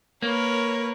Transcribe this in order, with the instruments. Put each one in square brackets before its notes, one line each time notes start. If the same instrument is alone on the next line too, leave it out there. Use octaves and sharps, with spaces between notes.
[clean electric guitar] A#3 [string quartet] A#4 B4 C#5